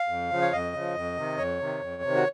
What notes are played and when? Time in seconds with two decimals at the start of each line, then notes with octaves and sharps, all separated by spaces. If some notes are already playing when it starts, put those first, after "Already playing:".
Already playing: F5
0.08 F2
0.30 C#3 F3
0.42 C#5
0.52 F2 D#5
0.73 C#3 F3
0.95 F2
1.17 C3 D#3
1.37 F2 C#5
1.60 C3 D#3
1.81 F2
2.03 C3 D#3
2.16 F#4